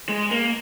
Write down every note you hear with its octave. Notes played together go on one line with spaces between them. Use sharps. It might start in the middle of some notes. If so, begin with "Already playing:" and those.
G#3
A#3